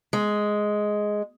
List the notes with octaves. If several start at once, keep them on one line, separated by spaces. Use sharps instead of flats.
G#3